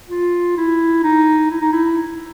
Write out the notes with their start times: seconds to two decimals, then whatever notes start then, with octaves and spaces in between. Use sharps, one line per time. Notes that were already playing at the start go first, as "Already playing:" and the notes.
0.10 F4
0.58 E4
1.04 D#4
1.50 E4
1.61 D#4
1.72 E4